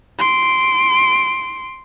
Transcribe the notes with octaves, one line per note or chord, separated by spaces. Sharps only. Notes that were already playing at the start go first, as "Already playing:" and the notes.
C6 D7